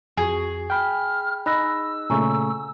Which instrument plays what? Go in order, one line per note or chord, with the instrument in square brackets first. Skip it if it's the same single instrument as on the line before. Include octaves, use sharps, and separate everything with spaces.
[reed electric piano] F2 [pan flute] F#4 [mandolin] G#4
[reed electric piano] G5 B5 G6 [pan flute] F6
[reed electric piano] D#4 D#5 [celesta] B5 F#6 A#6 [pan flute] E6
[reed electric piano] A#2 C#3 A3 [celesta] G#5 A#5 C#6